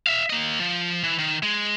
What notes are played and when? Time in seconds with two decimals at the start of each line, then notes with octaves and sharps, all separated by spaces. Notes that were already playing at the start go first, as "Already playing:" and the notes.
0.07 E5 F5
0.30 A#3 D#5
0.60 F3
1.04 E3
1.19 D#3
1.43 G#3